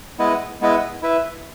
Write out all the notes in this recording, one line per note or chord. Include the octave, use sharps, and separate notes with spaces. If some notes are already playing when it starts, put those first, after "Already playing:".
G#3 B3 E4 B4 D#5
G#3 B3 E4 B4 D#5
E4 B4 E5